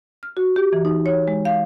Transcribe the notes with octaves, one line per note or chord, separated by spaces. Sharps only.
F6
F#4
G4
E3
D#4
C#5
G#3
F5